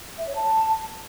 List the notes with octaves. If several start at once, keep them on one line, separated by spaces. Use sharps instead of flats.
E5
C#5
A5